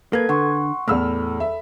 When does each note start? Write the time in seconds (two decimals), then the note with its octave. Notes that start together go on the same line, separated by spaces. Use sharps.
0.13 A#3 A4 B4 G#6
0.29 D3 F#5 C6 C#6
0.88 E2 A2 A4 B5 E6 F6
1.40 E5